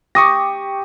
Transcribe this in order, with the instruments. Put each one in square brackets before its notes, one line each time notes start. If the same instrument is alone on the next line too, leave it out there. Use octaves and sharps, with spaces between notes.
[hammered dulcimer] G4 [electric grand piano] C#6 D#6 A#6